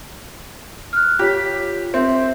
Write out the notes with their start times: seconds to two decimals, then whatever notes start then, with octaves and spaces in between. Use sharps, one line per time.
0.93 F6 F#6
1.19 F4 G4 C#5 B6
1.94 C4 E5 G6